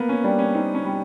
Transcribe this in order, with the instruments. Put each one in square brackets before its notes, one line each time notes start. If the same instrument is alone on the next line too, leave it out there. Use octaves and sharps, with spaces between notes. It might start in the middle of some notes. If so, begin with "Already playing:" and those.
Already playing: [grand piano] A#3 [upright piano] B3
[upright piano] C#4
[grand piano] G3 [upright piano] D4
[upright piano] C#4
[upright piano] C4 [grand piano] D#4
[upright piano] C#4
[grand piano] G3